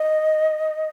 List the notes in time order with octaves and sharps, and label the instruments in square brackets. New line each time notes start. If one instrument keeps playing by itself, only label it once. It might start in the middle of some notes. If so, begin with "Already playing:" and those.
Already playing: [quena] D#5